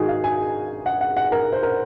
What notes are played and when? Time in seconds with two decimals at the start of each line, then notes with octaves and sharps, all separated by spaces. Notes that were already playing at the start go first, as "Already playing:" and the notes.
Already playing: G#2 D#3 D#4 F#4 G#4
0.09 F5
0.24 G#5
0.86 F#5
1.01 F#5
1.17 F#5
1.32 A#4
1.52 C5
1.63 A#4